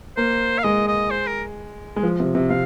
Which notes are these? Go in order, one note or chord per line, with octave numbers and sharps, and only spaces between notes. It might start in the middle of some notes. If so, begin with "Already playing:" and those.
A#3 C5
F5
G#3 D#5
D#5
C5
A#4
G#3
F3
C3
C3
C3 F5